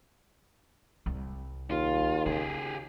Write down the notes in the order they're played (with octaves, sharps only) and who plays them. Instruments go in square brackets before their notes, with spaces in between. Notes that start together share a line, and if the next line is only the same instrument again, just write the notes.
[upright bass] C2
[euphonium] D#2 [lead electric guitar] F4
[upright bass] C#3 [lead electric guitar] G4 G#4